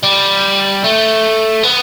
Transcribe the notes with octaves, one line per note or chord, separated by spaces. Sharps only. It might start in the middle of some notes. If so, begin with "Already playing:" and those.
G3
A3
B3